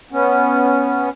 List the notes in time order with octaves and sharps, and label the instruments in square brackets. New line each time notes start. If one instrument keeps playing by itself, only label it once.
[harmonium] B3 C#4